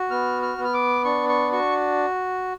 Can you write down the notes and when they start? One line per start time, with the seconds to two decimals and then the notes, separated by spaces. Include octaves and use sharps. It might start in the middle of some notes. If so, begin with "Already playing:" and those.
Already playing: F#4
0.11 B3 F6
0.42 F6
0.58 B3
0.64 F6
0.74 D6
1.05 D4 C#6
1.29 C#6
1.52 F#4 C#6